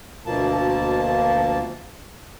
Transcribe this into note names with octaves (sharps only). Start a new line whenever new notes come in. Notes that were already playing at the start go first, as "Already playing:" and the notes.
D2 B2 F3 A#3 A5